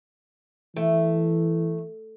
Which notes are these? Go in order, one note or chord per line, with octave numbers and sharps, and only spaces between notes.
E3 A3